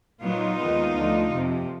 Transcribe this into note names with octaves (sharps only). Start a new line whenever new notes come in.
A#2 F#3 B3 D#4 F4
D#2 D#3 G#3 B3
D2 D3 F3
F2 C3 F3